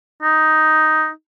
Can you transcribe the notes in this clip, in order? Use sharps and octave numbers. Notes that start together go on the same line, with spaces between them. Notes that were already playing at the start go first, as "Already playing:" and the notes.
D#4